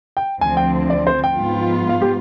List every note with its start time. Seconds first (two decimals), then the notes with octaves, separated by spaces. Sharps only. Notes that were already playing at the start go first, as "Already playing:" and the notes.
0.17 G5
0.40 D2 D3 F3 C4 G#5
0.57 G5
0.90 D5
1.07 C5
1.24 G5
1.40 G#2 F3 B3 F4
1.89 F5
2.02 G4